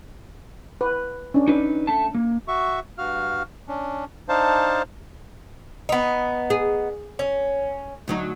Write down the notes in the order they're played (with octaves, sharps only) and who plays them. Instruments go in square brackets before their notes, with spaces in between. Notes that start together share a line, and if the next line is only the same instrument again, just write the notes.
[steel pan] B4
C#4 D4
[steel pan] D4 [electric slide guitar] D#4 B4
[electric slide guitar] A3 A5
A#3
[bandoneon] F#4 E5 C#6
G2 F#4 F5 F6
C#4 D4
D4 D#4 C5 F5 A5
[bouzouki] B3 D#4
[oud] G#4
[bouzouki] C#4
[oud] D2 F#3 D#4